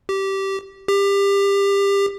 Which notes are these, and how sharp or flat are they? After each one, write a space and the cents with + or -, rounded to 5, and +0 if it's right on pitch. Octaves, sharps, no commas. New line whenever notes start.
G4 -15
G4 +25